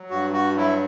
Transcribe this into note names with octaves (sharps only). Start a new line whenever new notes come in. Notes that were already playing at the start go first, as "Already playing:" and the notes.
Already playing: F#3
G2 F#4
F#4
F#3 E4